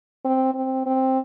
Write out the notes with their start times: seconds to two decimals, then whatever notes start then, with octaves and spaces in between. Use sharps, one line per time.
0.25 C4
0.55 C4
0.86 C4